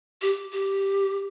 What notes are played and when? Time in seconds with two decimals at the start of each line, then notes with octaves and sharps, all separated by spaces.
0.22 G4
0.52 G4